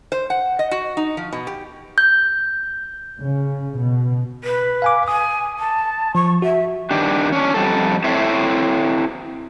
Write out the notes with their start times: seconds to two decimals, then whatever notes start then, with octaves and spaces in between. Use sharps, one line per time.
0.12 C5
0.30 F#5
0.59 D#5
0.71 F#4
0.97 D#4
1.17 F3
1.33 B2
1.47 G4
1.98 G6
3.21 C#3
3.77 B2
4.44 B4
4.82 F5 G#5 D6
5.08 G#5 D#6
5.59 A5
6.15 F3 C#6
6.42 F#4 E5
6.91 D#3 D4 G4
7.32 C#4 D4
7.54 F2 G3 A4
8.04 C4 E4 A4 C5 C#5 E5